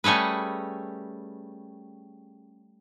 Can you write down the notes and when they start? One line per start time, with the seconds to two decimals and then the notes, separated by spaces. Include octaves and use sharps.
0.04 G3 A3 C#4 G#4 B4